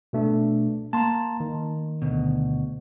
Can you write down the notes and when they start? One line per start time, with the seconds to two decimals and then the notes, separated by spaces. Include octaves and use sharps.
0.13 B2 A3 D4
0.93 A#3 A5 A#5 C6
1.40 D#3
2.02 D2 B2